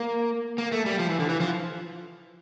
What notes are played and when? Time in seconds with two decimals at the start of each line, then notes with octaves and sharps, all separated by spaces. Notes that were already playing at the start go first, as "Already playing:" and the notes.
Already playing: A#3
0.58 A#3
0.72 A3
0.86 G3
0.99 F3
1.09 E3
1.20 D3
1.30 E3
1.40 F3